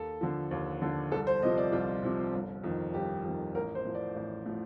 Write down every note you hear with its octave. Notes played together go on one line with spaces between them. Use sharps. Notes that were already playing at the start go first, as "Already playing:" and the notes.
Already playing: D#2 A4
D3 F3
D#2
D3 F3
C2 A4
C5
C3 F3 D#5
D5
C2 F4
C3 F3
G1
F2 D#3
G1 G4
F2 D#3
A1 A#4
C5
A2 F3
D5
A1
A2 F3